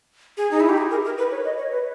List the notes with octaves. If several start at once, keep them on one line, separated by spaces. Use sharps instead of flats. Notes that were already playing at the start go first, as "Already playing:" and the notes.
G#4
D#4
E4
G4
G#4
A#4
A#4
B4
C#5
D#5
C#5
B4